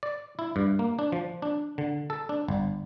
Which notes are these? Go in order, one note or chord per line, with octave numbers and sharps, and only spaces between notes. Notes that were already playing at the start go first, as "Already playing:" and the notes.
D5
E4
G2
A#3
D4
F3
D4
D3
A4
D4
G1